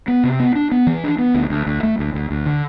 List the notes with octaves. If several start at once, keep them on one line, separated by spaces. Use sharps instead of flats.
B3
C3
B3
D4
B3
E3
D4
B3
D2
D2
D2
A3
D2
D2
D2
D3